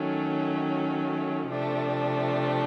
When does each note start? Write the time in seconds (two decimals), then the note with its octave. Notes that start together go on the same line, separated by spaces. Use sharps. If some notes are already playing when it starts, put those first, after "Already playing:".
Already playing: D#3 F#3 A3 C#4
1.49 C3 F3 A3 D4